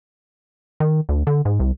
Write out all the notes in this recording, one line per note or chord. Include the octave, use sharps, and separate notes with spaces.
D#3
D2
D3
G#2
C2